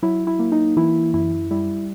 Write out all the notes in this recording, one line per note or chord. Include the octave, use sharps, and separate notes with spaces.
F#3 E4
E4
A#3
D#4
E3 E4
F#2 E4
G3 E4